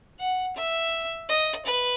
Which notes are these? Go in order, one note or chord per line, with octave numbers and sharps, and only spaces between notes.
F#5
E5
D#5
B4